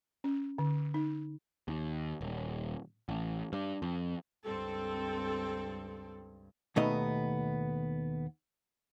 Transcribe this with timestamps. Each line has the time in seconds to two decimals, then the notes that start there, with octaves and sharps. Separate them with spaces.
0.24 C#4
0.58 D3
0.94 D#4
1.68 D#2
2.21 D#1
3.09 A1
3.53 G2
3.82 F2
4.45 C#2 G2 C4 A4
6.76 D#2 B2 A3 B3 D#4 D#5